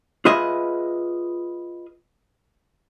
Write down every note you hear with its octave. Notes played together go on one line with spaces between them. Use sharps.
F4 G#4 B4 D#5 E5